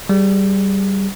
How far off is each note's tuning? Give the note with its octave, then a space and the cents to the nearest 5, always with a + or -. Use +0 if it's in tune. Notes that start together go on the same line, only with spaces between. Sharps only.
G3 -10 G#4 +0